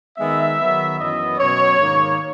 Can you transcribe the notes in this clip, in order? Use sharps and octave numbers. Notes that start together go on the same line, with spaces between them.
D#3 G#3 B3 D#4 E5
D#3 F#3 B3
F#2 E3 B3 D#5
B2 F#3 C#4 C#5
G#2 D#3 A#3 D#4